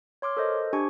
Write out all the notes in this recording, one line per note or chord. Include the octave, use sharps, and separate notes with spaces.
C#5 C6 D6 F6
A4 A#4 C5 D#5
D4 G4 C5 G#5 C#6 G#6